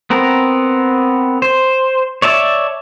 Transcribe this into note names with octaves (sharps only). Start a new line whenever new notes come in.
B3 C4 A#4
C5
C#5 D5 E5 A5